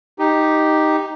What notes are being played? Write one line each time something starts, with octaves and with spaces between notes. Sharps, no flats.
D#4 G4